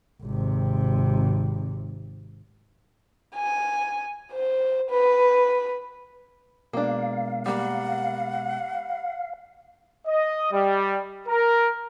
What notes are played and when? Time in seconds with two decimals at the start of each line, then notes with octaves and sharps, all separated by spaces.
0.22 G#1 C3
3.36 G#5
4.32 C5
4.90 B4
6.73 B2 G#3 A#3 B3 D4 F5
7.46 G3 A#3 F#5
10.07 D#5
10.52 G3
11.28 A#4